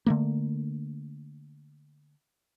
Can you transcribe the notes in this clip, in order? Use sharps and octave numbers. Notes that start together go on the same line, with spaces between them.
D3 A3 A#3